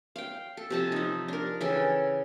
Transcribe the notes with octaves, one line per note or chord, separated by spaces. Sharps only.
F5 G5
A4
C3 F3 A5
F3 D#4
D4 A#4
C#3 E3 A4 G5